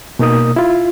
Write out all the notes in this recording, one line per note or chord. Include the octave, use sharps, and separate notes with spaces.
B2 A#3 D#4 A#4 D#6
E4 F4